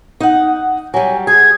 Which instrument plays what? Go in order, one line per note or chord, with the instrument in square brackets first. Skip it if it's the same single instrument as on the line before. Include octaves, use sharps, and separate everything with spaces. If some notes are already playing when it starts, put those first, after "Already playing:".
[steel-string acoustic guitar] D#4 F#5
[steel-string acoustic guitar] F#3 G3 [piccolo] G#5
[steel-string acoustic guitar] G#4 [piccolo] G#6